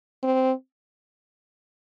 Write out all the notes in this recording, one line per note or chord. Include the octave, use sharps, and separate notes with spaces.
C4